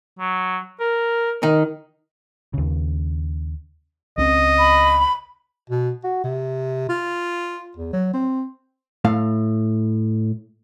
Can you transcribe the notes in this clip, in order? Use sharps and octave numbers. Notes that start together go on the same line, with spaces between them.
F#3
A#4
D#3 D#4
D#2 C#3
C#2 C4 C#4 D#5
B5
B2
F#4
C3
F4
E2
F#3
C4
A2 A3 F5